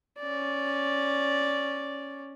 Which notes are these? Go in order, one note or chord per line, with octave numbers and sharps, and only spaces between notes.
C#4 D5